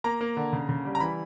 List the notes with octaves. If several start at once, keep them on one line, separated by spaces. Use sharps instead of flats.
A#3 A#5
A#3
D3
C#3
C#3
G3
A#5
E3 B5